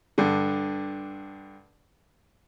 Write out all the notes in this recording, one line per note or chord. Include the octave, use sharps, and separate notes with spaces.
G2 D3